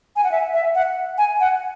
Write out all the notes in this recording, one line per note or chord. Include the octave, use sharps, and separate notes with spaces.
G#5
F#5
E5
E5
F#5
G#5
F#5